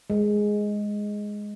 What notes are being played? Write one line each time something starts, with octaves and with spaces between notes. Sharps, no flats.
G#3